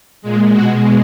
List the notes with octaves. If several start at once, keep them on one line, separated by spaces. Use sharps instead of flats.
A#2 G#3
B2 G#3 F#4